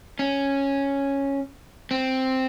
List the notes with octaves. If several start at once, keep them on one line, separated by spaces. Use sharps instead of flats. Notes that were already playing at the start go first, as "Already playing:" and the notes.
C#4
C4